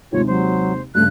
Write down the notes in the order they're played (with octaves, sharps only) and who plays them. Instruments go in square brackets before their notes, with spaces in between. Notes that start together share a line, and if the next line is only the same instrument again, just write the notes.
[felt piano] D#2 C3 G#3 [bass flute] F4 [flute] C#5
[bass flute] F#3 [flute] C5
[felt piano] G2 C#3 [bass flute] A3 [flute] F#6